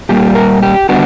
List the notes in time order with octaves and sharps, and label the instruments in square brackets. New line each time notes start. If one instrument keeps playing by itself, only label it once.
[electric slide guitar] A#2 G3 A#3 G4
A#4
G4
D3 G3 B3 D4 F#4